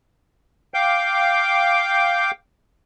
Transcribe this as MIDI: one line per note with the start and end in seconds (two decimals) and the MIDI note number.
0.74 2.31 77
0.74 2.31 79
0.74 2.31 86
0.74 2.31 91